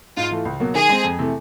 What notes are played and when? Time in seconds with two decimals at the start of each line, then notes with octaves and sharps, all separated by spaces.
0.17 G#2 F4
0.31 E3 A3
0.45 C#2
0.60 B2 F#3 A#3
0.75 D#3 G#4
0.89 G#3 C4
1.04 F2
1.19 C3 E3 A3